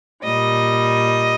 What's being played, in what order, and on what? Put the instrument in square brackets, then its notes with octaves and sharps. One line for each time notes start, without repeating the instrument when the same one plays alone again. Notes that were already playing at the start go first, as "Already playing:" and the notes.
[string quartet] A#2 G3 D#5